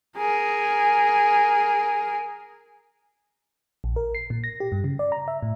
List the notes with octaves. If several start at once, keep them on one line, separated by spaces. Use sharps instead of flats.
G#4 A#4
A#1
A#4
C7
A#2
A#6
G4
G2
C#3
D5
A#5
E5
A2